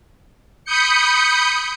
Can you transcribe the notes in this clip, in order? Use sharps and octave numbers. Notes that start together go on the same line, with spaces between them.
B5 D#6 G6 C#7